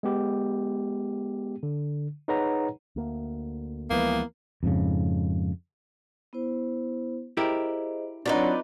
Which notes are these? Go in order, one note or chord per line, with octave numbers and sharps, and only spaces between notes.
G#3 B3 G4
D3
D#4 G#4 B4 C#5 F#5 A#5
D2 A#3
D2 E3 F3 G#3 A#3 B3
F2 G#2 C#3
B3 E4 C5
E4 G4 G#4 A#4 C5 D#5
F#3 C4 D4 D#4 F4 B4 D5 C6